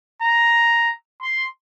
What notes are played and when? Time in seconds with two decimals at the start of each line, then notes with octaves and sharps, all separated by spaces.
0.22 A#5
1.22 C6